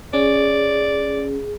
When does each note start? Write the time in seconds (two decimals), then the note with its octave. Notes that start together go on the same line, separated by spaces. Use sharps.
0.14 C#4 G#4 D5